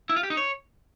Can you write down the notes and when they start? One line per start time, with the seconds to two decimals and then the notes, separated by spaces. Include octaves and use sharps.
0.09 E4
0.16 F4
0.23 G4
0.30 D#4
0.37 C#5